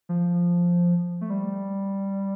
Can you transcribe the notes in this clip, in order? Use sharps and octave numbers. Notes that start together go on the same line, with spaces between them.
F3
A3
G3